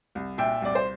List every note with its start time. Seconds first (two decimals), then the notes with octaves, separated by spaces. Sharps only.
0.15 C2
0.38 A#2 E5 G5
0.62 C2 D5
0.75 C5